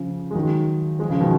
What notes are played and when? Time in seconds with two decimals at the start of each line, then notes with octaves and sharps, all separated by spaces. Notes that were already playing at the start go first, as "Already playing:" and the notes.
Already playing: C#3 F3
0.31 G#3
0.35 D#3 F#3
0.99 F3 G#3
1.10 C#3 F3
1.20 B2 D#3